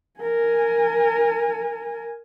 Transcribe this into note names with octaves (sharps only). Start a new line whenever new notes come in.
A#4 G#5